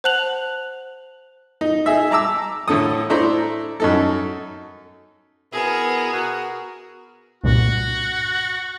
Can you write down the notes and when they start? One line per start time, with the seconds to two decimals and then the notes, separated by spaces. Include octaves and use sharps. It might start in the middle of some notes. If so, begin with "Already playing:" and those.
0.04 C5 F#5 A5 F#6 F7 F#7
1.61 D#4
1.86 D#4 G#4 E5
2.11 A5 A#5 D6 E6
2.68 A2 D3 A4 D#6
3.10 A3 D4 E4 C5 A#5
3.80 F#2 D#4 A4
5.53 B2 B3 E4 G#4 A#4
6.13 F#4 A#4
7.44 C2 G2 A#2 F#4